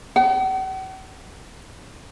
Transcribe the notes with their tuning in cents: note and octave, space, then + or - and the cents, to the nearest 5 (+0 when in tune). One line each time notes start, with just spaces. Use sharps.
F#5 +45